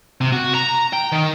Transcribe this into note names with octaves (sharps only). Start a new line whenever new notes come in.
C3
F#4
A#5
G5
D#3